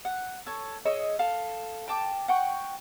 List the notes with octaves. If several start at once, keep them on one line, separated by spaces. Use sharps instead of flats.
F#5
A4 C#5
G#4 C#5 D#5 E6
A4 F5
G5 A5 D6
F#5 G5 C#6